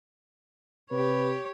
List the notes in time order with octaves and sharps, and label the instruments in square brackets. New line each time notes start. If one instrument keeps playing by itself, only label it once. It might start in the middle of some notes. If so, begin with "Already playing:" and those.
[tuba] C3 [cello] G4 C#5 [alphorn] B4